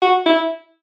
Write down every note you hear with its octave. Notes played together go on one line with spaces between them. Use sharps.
F#4
E4